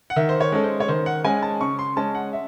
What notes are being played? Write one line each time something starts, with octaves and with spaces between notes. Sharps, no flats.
F#5
D#3 E5
C5
C#5
G#3 C#4 A4
C5
C#5
D#3 C5
F#5
G#3 C#4 G#5
A5
C#3 C#6
C6
G#3 C#4 A5
F#5
E5